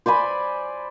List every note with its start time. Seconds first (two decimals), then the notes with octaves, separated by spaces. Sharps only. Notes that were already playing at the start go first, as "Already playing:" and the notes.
0.06 C5 D5 G#5 B5